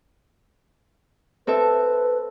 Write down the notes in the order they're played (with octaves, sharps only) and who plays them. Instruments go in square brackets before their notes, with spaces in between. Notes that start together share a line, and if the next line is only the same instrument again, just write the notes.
[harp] C4 A4 E5 [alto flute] B4